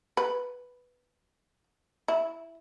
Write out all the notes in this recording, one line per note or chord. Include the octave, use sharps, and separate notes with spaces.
B4
E4